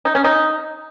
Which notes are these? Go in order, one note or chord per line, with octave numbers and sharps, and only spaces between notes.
D#4
C#4
D#4